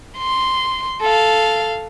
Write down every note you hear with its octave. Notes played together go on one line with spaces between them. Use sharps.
C6
A4 F5